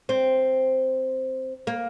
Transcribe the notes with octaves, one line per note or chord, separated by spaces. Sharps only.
C4
A#3